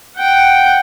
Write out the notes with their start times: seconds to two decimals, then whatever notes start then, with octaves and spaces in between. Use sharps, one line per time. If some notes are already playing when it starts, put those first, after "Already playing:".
0.17 F#5 G5